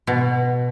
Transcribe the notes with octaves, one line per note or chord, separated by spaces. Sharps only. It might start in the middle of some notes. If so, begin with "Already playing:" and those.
B2